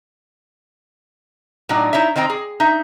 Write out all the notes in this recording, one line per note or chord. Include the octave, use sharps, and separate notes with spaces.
A2 F#3 D4 D#4
D#4 E4 C#5 E5
D#3 C4 D#5 G5 A#5
G#4
D#4 E5